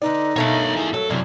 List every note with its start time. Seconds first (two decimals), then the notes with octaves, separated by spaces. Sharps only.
0.02 D3 D#4 B4 D5
0.36 G2 B2 A3 A#3 C#5 D#5
0.76 E4 G#4
0.94 F#3 A4
1.10 F#2 C3 D4 E4